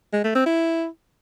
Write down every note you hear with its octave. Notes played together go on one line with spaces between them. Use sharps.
G#3
A3
C4
E4